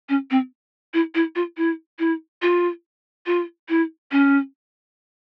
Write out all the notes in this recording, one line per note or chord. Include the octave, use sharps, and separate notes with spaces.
C#4
C4
E4
E4
F4
E4
E4
F4
F4
E4
C#4